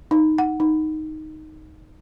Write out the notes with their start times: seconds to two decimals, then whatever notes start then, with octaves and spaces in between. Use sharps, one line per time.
0.11 D#4
0.38 F#5
0.60 D#4